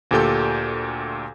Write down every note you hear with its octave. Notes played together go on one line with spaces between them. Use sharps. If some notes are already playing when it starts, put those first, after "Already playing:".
D2 A#2 G4 A4 G6